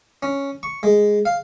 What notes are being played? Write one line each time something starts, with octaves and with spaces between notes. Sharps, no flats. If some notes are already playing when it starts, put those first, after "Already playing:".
C#4
C#6
G#3
F5